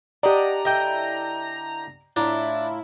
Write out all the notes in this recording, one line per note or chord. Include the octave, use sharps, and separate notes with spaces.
D4 G4 D5 D#5 F#5 A#5
D3 E4 D#5 E5 G5
A2 D4 E4 F4 A#5